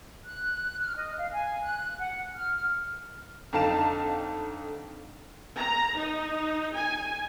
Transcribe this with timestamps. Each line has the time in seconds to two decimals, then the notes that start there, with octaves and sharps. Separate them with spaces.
0.25 F#6
0.81 F6
0.97 D#5
1.18 F5
1.33 G#5
1.63 F#6
1.99 F#5
2.35 F6
3.53 F2 D3 D#4 F5 A5 E7
5.56 A#5
5.97 D#4
6.74 G#5